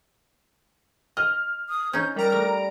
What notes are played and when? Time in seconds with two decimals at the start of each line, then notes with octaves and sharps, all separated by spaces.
1.17 D#5 F6
1.69 D#6
1.93 C#4 D#4 G6
2.16 G3 A#4 A#5 D7
2.32 A3